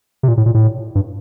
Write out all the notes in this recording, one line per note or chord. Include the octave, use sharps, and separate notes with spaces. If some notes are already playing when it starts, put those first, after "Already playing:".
C3
A#2
A2
A#2
A2
G2